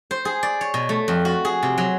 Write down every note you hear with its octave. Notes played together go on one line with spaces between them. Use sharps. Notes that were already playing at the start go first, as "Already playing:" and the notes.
C5
G#4
D5
C#5
B2
A3
F2
F#4
G#4
C3
F#3